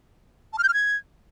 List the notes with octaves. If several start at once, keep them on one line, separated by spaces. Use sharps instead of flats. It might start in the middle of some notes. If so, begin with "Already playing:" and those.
A5
F6
G6
F6
G#6